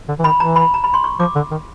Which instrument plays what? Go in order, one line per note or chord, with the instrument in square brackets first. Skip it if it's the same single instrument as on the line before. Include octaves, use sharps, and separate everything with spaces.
[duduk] D3
E3
[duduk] D#3 [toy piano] B5
[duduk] E3 [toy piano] A#5
[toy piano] B5
A#5
B5
C6
C#6
[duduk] F3 [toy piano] D6
[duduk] D3
D#3